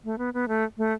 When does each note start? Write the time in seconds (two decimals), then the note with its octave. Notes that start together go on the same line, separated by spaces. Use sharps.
0.05 A3
0.18 B3
0.34 B3
0.48 A3
0.78 A3